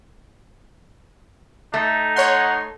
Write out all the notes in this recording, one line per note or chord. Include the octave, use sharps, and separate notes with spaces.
A3 D#4
C#5 F#5 C6